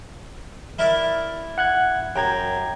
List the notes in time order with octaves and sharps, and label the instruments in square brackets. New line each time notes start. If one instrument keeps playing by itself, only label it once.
[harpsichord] E4 A#4 D5
[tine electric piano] F#5 F#6 G#6
[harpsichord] F#2 [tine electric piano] G5 A#5 G#6